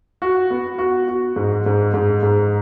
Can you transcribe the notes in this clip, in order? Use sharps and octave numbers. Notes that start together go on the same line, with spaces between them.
F#4
B3
F#4
F#4
G#2
G#2
G#2
G#2